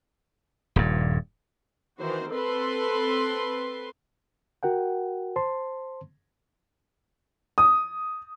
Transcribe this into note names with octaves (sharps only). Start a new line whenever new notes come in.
D#1 G2
D#3 E3 F#4 C5
C4 A4 B4 C6
F#4 A#4 F#5 G5
C5 A5 C6
D#6